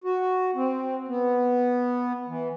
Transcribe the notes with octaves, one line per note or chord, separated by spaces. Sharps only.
F#4
C4
B3
E3